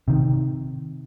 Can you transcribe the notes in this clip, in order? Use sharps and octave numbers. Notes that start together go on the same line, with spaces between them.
C3 D#3